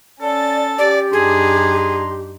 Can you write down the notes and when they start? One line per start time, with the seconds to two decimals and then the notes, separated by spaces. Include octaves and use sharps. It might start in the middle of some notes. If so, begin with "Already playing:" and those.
0.21 C#4 A4 D5 A6
0.78 G4 D5
1.13 F#2 D4 D#4 G#4 C6